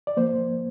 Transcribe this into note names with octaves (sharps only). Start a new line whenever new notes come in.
D5
F3 A#3 C5